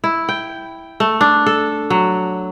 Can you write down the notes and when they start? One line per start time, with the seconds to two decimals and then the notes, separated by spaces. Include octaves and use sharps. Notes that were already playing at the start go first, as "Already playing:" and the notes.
0.04 E4
0.29 G5
1.00 A3
1.21 D4
1.46 A4
1.90 F#3